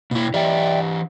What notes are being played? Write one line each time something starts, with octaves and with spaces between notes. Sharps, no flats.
B2 A#3 E4
E3 G4 D5 E5 G5